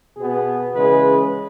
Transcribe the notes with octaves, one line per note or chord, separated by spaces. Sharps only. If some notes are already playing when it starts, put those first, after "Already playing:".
B2 B3 G#4
C#3 E3 G#3 B4